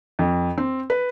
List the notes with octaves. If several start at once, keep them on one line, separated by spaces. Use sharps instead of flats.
F2
C4
B4